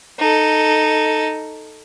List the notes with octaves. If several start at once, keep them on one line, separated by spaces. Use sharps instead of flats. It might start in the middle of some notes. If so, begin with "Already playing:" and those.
D#4 A4